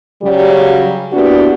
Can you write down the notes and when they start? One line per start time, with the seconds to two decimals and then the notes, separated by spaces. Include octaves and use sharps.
0.22 C#3 F#3 G3
1.13 A#3 B3 D4 E4 F#4 G4